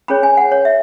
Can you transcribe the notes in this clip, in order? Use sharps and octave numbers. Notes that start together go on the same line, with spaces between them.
C#4 G#4 C#5 B5
G#5
F#5
C#5
E5